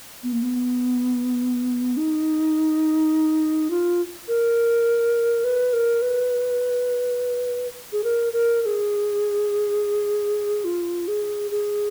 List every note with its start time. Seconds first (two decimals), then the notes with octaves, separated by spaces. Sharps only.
0.23 B3
0.32 A#3
0.42 B3
1.97 D#4
3.70 F4
4.28 A#4
5.44 B4
5.73 A#4
6.02 B4
7.93 G#4
8.04 A#4
8.33 A#4
8.62 A#4
8.66 G#4
10.64 F4
11.08 G#4
11.51 G#4